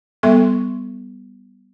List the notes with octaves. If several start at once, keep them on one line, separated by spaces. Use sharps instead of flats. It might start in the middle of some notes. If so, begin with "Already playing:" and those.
G3 B3 A4 E5 C6 C#6